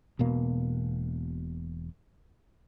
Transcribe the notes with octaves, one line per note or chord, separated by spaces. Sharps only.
E1 B2 A#3